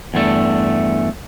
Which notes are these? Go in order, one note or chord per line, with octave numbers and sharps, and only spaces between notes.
E2 G2 A3